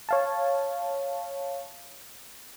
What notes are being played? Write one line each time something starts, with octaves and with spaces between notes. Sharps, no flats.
C#5 F5 A5